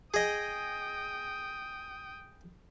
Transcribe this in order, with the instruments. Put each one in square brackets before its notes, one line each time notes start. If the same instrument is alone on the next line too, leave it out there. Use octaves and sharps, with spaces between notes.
[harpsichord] G#4 D#5 [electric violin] G5 D#6